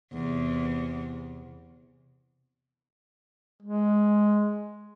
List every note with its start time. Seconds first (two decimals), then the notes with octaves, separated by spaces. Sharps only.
0.13 E2 C3
3.63 G#3